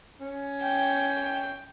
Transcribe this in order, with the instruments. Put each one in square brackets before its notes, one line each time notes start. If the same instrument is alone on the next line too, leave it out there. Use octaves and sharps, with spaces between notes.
[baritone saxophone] C#4
[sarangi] G5